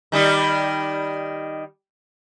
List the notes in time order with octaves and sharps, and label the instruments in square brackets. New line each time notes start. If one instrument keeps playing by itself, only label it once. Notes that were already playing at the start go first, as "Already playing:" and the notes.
[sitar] D#3 G3 D#4